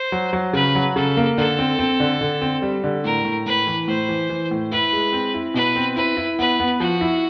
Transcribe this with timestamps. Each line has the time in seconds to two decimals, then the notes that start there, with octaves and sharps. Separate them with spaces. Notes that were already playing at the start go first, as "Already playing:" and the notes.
Already playing: C5
0.12 F#3
0.33 F#3
0.53 C#3 B4
0.75 F#3
0.96 C#3 A4
1.17 A#3
1.38 D3 A4
1.59 C4
1.79 C4
2.00 D3
2.21 D3
2.42 C4
2.62 G3
2.84 D3
3.04 A2 A#4
3.25 A2
3.46 A2 B4
3.67 E3
3.88 A2 C5
4.09 E3
4.30 E3
4.51 A2
4.72 E4 B4
4.93 G#3
5.13 C4
5.34 E4
5.54 B2 B4
5.76 C4
5.96 E4 B4
6.17 E4
6.39 B3 B4
6.60 B3
6.80 F3 F#4
7.01 E4